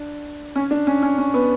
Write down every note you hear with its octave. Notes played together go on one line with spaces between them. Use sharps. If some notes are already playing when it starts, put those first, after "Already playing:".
Already playing: D4
C#4
D4
C#4
C#4
C#4
B3